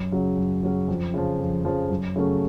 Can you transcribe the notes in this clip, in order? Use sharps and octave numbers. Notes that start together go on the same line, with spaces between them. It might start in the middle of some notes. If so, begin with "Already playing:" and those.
Already playing: F#2
C#3 F#3 C#4
F#2
C#3 F#3 C#4
F2
C#3 F3
F2
C#3 F3
F#2
C#3 F#3 A3 C#4